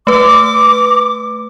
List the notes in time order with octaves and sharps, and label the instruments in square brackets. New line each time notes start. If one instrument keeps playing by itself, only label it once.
[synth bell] A3 B4 [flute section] D6